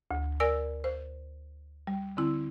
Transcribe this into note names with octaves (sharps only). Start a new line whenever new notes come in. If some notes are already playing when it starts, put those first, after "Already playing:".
D2
A#4 D5 G#5 E6
C5
G3
D3 C4 E4